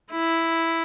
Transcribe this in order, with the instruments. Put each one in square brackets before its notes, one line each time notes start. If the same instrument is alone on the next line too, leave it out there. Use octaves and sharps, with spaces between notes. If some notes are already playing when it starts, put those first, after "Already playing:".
[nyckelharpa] E4